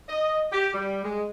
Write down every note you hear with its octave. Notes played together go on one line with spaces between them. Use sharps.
D#5
G4
G3
G#3